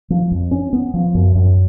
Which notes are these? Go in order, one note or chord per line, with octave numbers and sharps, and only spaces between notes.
F3
F2
C#4
B3
F3
F#2
F#2